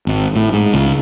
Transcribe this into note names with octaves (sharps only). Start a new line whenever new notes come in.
G#1
A2
G#2
C#2